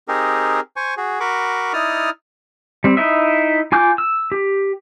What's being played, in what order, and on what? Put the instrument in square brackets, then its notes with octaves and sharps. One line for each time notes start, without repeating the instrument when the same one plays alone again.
[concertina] C4 D#4 G4 G#4 A#4
C5 G#5 C#6
F#4 G#4
F#4 A#4 B5 C#6 D6
D#4 E4 D5 D#6 F6
[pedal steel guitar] G3 C4
D#4 E4 D#5 E5
F4 G#5 D6 G6
E6
G4